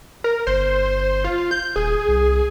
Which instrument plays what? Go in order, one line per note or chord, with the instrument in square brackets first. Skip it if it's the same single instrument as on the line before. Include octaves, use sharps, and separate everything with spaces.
[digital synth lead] A#4
[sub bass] G1 [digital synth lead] C5
[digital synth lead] F4
G6
[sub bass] D#1 [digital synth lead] G#4
[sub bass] C2